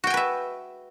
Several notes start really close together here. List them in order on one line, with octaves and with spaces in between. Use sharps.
F#4 G5 G#5 B4 E5